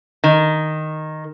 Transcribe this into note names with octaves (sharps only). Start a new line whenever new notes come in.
D#3